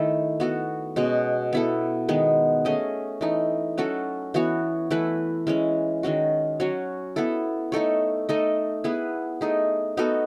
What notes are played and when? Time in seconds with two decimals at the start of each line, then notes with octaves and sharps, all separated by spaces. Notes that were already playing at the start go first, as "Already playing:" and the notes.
Already playing: D#3 A3 E4 A4
0.40 B3 F#4 A4
0.96 B2 G#3 C#4
1.53 B3 E4 A4
2.09 D#3 G#3 B3
2.65 A3 C#4 G#4 D#5
3.21 E3 A3 D#4
3.78 F#3 C#4 F#4 A4
4.34 E3 B3 F#4 C#5
4.91 E3 A3 E4 B4
5.47 E3 G#3 C#4
6.03 D#3 G#3 C#4 F#4
6.60 F#3 C#4 F#4 C#5
7.16 B3 E4 A4
7.72 A3 D#4 A4 C#5
8.29 A3 D#4 A4 D#5
8.84 B3 E4 G#4 B4
9.41 A3 D#4 G#4
9.97 B3 D#4 F#4 A4